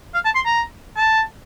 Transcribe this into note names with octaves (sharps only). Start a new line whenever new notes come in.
F5
A5
C6
A#5
A5